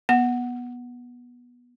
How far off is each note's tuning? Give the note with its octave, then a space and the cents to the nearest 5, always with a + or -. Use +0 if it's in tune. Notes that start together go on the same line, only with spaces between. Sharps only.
B3 -15 F#5 +0